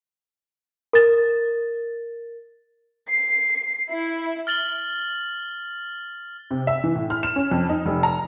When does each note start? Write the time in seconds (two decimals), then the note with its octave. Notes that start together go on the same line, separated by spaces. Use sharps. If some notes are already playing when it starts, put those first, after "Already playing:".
0.93 A#4 A6
3.10 C7
3.91 E4
4.47 F6 A6 F#7 G7
6.51 C3
6.67 E5
6.84 E3
6.95 A2
7.10 F6
7.23 E7
7.36 C#4
7.51 F2
7.69 D#4
7.85 F1
8.03 A#5